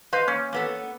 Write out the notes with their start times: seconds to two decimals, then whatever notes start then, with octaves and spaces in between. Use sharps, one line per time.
0.13 B4 C5 D#5 F5
0.28 A#3 C#4
0.53 A#3 B3 A4